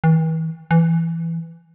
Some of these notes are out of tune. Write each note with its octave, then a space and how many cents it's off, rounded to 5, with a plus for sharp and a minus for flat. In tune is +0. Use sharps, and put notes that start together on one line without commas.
E3 -40
E3 +10